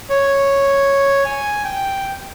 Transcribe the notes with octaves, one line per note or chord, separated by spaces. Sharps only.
C#5
G#5
G5